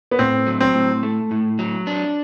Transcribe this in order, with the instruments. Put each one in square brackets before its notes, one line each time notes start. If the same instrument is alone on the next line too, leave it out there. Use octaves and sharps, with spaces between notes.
[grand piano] B3
[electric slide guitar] A2 [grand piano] C4
[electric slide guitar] F#3
[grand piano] C4
[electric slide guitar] A2
A3
A2
F#3
D4